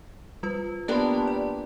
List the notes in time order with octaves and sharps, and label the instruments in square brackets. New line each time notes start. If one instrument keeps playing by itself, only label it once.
[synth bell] G3 F4 B4
[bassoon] G3 [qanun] A#3 B3 D4 [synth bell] A5 C6
[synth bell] D5